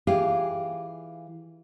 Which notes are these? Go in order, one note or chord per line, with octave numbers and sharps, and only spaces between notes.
E3 F4 G4 G#4 F5